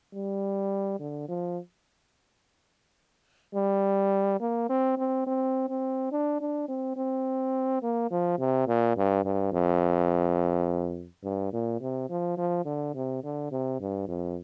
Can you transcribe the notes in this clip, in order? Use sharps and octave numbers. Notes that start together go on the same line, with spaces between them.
G3
D3
F3
G3
A#3
C4
C4
C4
C4
D4
D4
C4
C4
A#3
F3
C3
A#2
G2
G2
F2
G2
A#2
C3
F3
F3
D3
C3
D3
C3
G2
F2